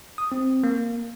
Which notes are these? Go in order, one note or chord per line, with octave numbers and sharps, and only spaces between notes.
D#6
C4
A#3